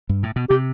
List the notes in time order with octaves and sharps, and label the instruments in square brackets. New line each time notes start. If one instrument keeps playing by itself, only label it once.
[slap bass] G2
A2
B2
[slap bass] C3 [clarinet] G4